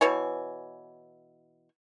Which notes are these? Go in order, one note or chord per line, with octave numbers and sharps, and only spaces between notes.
B2 E3 C#5 G#5